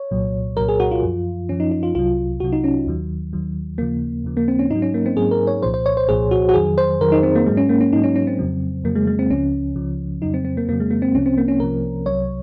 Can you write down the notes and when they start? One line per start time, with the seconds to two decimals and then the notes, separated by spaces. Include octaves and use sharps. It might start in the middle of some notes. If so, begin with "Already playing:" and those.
Already playing: C#5
0.11 C2 A#2 F#3
0.57 C2 A#2 F#3 A#4
0.68 G#4
0.80 F#4
0.91 F4
1.03 F#2 F3
1.49 F#2 F3 C#4
1.60 D#4
1.71 D#4
1.83 F4
1.95 C2 C3 F#3 F4
2.40 C2 C3 F#3 F#4
2.52 D#4
2.64 C#4
2.87 D#2 D#3 F#3
3.33 D#2 D#3 F#3
3.78 D#2 C#3 F3 A#3
4.24 D#2 C#3 F3
4.37 A#3
4.48 C4
4.59 C#4
4.70 G#2 F#3 D#4
4.82 C#4
4.94 A#3
5.06 C4
5.16 G#2 F#3 G#4
5.31 A#4
5.47 C#5
5.62 C2 A#2 F3 C5
5.74 C5
5.86 C#5
5.97 C5
6.08 C2 A#2 F3 G#4
6.31 F#4
6.49 F#4
6.54 F2 D#3 F#3 G#4
6.78 C5
7.01 F2 D#3 F#3 A#4
7.12 D#4
7.23 C4
7.35 A#3
7.46 G#2 F#3 G#3
7.57 C#4
7.69 A#3
7.81 C#4
7.93 G#2 F#3 D#4
8.04 C#4
8.16 C#4
8.27 C4
8.39 F2 C#3 F#3
8.84 F2 C#3 F#3 A#3
8.95 G#3
9.07 G#3
9.19 C4
9.30 C#2 C#3 F3 C#4
9.76 C#2 C#3 F3
10.22 F2 C#3 F#3 D#4
10.34 C4
10.45 C4
10.57 A#3
10.68 F2 C#3 F#3 A#3
10.80 G#3
10.91 A#3
11.02 C4
11.14 C2 C3 F3 C#4
11.26 C4
11.38 A#3
11.48 C#4
11.60 C2 C3 F3 A#4
12.06 C2 C3 F#3 C#5